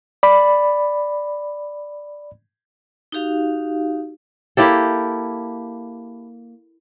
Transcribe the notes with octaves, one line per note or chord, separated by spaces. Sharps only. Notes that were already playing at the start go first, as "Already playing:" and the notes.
D5 B5
D#4 F#4 G4 F5
A#3 E4 G4 A4